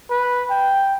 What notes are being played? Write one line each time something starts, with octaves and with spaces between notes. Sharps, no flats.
B4
G5